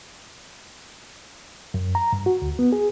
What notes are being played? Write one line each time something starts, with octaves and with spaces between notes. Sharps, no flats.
F#2
A#5
G2
F#4
D2
B3
G#4